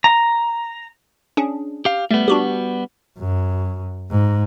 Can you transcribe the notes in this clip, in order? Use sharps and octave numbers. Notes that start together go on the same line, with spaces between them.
A#5
C#4 D4 G#4
G4 F5
G3 A3 B3
D4 F#4 G4
F#2
G#2